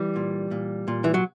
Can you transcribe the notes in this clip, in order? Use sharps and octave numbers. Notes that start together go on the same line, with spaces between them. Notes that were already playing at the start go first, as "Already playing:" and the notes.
Already playing: E3 G3
A#2
A#2
A#2
E3
F#3